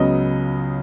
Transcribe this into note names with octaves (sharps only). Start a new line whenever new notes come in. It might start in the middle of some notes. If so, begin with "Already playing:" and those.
Already playing: C#2 C#3 F#3 B3 D#5